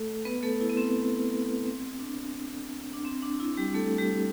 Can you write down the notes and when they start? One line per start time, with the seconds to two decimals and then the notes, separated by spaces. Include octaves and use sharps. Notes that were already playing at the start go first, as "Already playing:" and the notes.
Already playing: A3 A4
0.25 B3 B4
0.43 A3 A4
0.61 E4
0.70 B3
0.77 C4
1.66 C4
2.00 D4
2.93 D4
3.05 C4
3.22 D4
3.40 E4
3.57 G3 G4
3.75 A3 A4
3.98 G3 G4